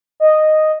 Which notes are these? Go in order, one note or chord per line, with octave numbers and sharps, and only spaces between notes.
D#5